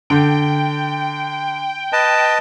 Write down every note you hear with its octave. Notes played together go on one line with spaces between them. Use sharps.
D3 G5
B4 D#5 A5